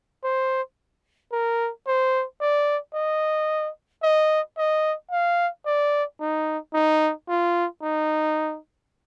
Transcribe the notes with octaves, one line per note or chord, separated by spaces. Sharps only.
C5
A#4
C5
D5
D#5
D#5
D#5
F5
D5
D#4
D#4
F4
D#4